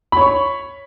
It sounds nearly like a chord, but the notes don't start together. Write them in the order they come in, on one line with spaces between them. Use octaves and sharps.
B5 C#5 C#6